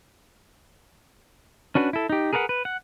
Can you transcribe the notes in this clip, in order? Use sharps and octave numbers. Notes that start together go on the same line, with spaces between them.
C#4 D4 F#4 B4
E4 A4
D#4 G4
G#4 A#4 B4 D5 F#5
B4
F#5